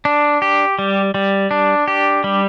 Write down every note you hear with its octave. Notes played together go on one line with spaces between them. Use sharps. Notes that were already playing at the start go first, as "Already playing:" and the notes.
D4
G4
G3
G3
D4
G4
G3